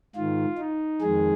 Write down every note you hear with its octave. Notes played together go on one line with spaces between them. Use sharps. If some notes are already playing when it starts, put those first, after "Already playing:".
G#2 D#3 F4
D#4
F2 D#3 G#3 G#4